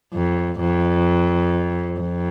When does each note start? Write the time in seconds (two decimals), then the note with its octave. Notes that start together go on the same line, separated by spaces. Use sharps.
0.13 F2
0.60 F2
2.00 F2